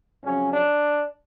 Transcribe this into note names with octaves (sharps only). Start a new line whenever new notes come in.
F2 C#3 F#3 C#4
D4